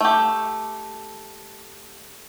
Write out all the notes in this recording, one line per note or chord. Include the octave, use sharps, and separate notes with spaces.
A3 G4